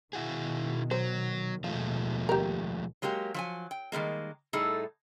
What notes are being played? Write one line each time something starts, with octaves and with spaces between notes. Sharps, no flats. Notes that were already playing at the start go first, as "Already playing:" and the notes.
B2 D#3 E4 F#4 G#4
F#3 C5
D#2 B2 F3 G#3 A3 F4
G4 A#4
F#3 G#3 A#3 G4
F3 F#3 G#5
G5
D#3 G3 G#3 A#3
A2 G3 A3 D#4 G#4 A4